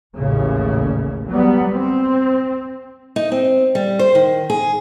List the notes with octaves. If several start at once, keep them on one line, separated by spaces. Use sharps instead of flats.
A1 D#2 C#3
F#3 G3 B3
C4
D#4
C4
G3
C5
D#3
G#4